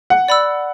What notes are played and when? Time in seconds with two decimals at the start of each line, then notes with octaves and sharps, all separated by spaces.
0.10 F#5
0.28 D5 B5 E6